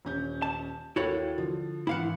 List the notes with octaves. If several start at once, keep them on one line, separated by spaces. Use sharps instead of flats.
D#1 C#4 G6
A5
D#2 E4 F#4 A4 C#5 A6
D3 F3
G#1 E3 E4 F5 F#5